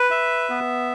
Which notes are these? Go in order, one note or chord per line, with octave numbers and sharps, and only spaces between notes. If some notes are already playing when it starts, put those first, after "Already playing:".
Already playing: B4
E5
B3